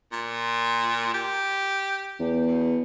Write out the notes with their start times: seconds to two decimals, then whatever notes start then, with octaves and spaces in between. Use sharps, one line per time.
0.12 A#2
1.14 G4
2.19 E2
2.48 B2